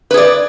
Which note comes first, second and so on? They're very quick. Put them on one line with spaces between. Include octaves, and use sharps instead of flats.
B4 G#4 D5